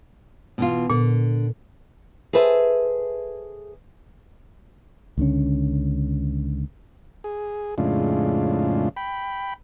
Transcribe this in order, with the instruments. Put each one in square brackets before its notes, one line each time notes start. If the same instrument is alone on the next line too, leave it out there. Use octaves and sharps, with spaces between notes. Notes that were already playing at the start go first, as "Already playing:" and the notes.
[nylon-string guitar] B2 E3 F4
[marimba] A#2 [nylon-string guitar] D3
[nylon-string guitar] G#4 A4 B4 C5 E5
[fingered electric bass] C#2 D3 C#4
[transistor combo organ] G#4
F2 A2 C#3 G#3 D4 F4
G5 B5